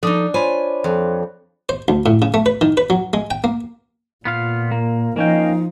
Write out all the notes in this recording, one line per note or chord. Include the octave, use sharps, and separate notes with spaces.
F3 D4 D#4 A4 D#6
F4 C5 C#5 G#5 B5
F2
C5
D2
A2
C#3
A3
B4
D#3
B4
F#3
G#3
G5
A#3
A#2 B3 F4 F5
A#3
F3 A#3 C#4 D#4 D#5 F5 G5